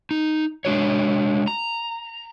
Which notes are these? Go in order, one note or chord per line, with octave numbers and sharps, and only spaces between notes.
D#4
G#3 D4 F#4 C#5
A#5